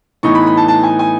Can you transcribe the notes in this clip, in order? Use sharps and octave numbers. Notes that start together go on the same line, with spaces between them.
A2 E3 B3 D#4 C#6
B5
B5
A5
A5
G#5
G#5